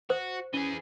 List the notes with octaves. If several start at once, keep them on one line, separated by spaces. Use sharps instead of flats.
F#4 C5
E3 C#4 G#4